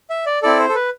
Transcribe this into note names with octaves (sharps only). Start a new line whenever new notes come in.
E5
D5
C4 E4 A4 D5
C5
A4
B4